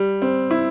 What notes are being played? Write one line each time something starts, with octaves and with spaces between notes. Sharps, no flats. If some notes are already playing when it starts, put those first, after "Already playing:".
Already playing: G3
C4
E4